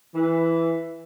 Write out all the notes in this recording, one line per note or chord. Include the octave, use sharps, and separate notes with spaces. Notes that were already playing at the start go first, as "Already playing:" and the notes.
E3